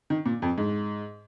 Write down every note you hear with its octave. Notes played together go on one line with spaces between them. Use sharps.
D#3
A#2
F2
G#2